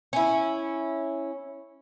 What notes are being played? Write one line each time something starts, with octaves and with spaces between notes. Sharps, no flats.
C#4 E4